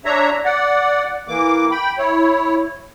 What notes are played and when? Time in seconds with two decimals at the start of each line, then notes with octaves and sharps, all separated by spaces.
0.05 D4 C#5 E5 A#5
0.45 D5 F#5
1.28 E3 A#3 D6
1.71 G5 B5
1.98 E4 C#5